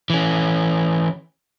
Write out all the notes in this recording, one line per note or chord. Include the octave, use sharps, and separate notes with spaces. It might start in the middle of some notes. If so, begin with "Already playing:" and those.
E3 C#4